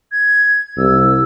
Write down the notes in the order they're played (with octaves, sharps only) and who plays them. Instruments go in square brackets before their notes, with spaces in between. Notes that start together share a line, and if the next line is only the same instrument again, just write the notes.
[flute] G#6
[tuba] C2 [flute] E6